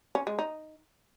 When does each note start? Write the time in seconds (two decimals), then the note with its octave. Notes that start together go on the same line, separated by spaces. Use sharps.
0.15 C#4
0.27 G#3
0.39 D#4